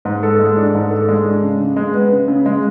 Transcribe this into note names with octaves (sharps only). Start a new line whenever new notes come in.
G#2
A4
G#3
D4
G#2
A4
G#3
D4
C#3
C#3
G#3
B3
C#3
C#3
G#3